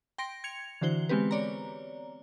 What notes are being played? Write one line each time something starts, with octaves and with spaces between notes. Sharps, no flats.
G5 C6 A#6 D7
G#6 C#7 F7
D3 E3 F#4 C5 G7
G#3 B3 C4 G4 B4
C#5 D5 A#5